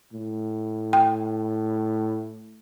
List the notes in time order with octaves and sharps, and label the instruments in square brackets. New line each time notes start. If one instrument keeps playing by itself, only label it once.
[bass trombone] A2
[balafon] G5